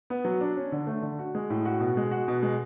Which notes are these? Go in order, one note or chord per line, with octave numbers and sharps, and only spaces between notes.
B3
F#3
D4
C#4
D3
A3
D3
F#4
G#3
A2
F#4
B2
G#3
F#4
B2
G#3